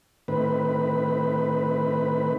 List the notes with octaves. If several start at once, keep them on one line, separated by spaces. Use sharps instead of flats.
A2 D#3 C4 B4